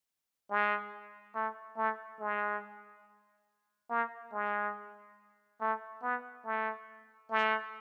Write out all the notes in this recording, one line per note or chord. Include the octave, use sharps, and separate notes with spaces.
G#3
A3
A3
G#3
A#3
G#3
A3
B3
A3
A3